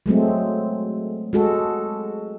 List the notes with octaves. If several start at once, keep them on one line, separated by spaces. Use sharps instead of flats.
F#3 G#3 A3 C4
G#3 F#4 A4